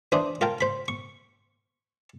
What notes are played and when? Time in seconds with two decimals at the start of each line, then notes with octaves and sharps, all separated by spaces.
0.12 E3 D4 C5 D#6
0.41 F4 A#4 G5 A5
0.61 C5 B5
0.88 C#6